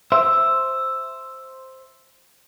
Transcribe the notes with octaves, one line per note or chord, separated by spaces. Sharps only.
C5 E5